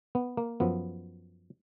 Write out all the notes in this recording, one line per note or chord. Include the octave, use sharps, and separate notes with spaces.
B3
A#3
F#2 F3 B3